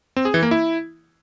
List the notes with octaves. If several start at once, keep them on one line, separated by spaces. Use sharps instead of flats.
C4
G#4
E3
A#3
E4